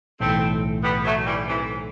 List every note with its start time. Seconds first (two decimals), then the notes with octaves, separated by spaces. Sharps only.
0.20 B1 A2 E3 A3 C4
0.83 G3 B3
1.05 F#3 A3
1.26 E3 G3
1.47 C3 E3